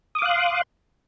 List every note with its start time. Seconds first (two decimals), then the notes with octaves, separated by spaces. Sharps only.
0.15 D#6
0.19 D6
0.22 F5
0.25 F#6
0.29 C6